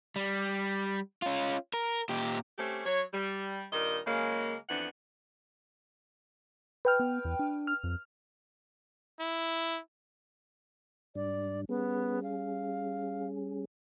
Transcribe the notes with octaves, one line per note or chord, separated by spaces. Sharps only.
G3
C#4 F4
A#4
A#2 G4
A3 C4 C#4 G4
F#3 C#5
G3
G2 A#2 D#3 A#4 D#5
C#3 F#3 G#3 A#3
F2 E3 B3 D4 F#5
B4 G5 F6
B3
E2
D4
F6
F2
E4
G#2 G3 D4 D5
G3 B3 C#4 G#4
F5